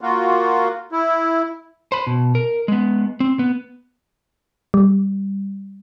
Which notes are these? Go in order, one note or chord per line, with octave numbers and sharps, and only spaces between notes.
A#3 F4 F#4
E4
C5 B5
B2
A#4
G#3 B3
C4
B3
G3